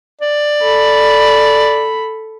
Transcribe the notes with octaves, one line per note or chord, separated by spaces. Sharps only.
D5
A4 B5